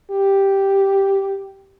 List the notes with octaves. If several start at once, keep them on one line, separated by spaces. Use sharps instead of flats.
G4